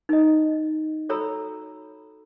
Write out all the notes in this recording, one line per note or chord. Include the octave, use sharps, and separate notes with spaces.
D#4 D#5
F#4 A4 C#5 A#5 B5 E6